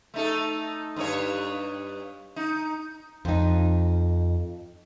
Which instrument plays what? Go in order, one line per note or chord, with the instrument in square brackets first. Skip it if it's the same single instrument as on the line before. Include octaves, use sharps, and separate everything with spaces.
[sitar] A3 D#4 A4
G2 D#4 C#5
D#4
[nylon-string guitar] F2 D#4